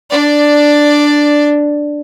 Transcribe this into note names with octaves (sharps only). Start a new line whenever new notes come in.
D4 D5